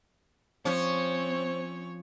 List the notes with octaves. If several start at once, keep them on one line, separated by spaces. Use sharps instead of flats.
F3 C4 C#4 C5 C#5